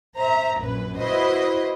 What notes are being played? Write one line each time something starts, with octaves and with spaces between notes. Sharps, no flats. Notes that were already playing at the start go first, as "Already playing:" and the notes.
C5 E5 A#5
A#1 F#2 B4
E4 F#4 B4 C5 D#5